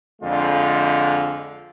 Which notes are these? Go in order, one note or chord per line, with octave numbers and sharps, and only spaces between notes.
F2 D3 G#3 F4